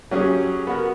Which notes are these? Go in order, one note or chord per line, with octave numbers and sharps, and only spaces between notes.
F#3 C#4 G4 G#4
B3 F#4 A#4